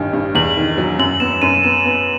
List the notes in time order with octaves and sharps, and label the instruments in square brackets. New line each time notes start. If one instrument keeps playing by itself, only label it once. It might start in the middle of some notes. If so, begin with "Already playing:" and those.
Already playing: [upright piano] A1 G2 D#3
G2
[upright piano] E2 [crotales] F#7
[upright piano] D#3
F#3
[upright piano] F#2 [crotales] F#7
[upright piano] B3 [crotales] E7
[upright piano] F#2 [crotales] D#7
[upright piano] B3 [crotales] E7
[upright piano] B3